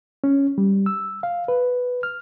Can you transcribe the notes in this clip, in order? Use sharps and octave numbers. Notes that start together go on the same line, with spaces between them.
C#4
G3
E6
F5
B4
F6